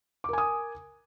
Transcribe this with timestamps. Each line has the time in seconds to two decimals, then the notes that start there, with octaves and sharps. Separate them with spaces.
0.24 D6
0.29 A#4
0.33 G#5
0.38 D#6